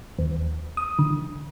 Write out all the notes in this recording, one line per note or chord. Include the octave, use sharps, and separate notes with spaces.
D#2
D#6
D3